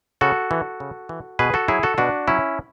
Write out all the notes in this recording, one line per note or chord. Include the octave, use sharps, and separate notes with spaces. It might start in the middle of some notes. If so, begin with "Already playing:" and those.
C#3 F#4 A4
E3
C#3
E3
B2 G#4 B4
F#4 A4
F#3 E4 G#4
F#4 A4
B2 D4 F#4
F#3 C#4 E4